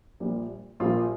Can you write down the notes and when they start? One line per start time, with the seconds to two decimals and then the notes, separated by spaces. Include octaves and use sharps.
0.20 A#1 A#2 G3
0.80 A#1 A#2 G3 A#3 F4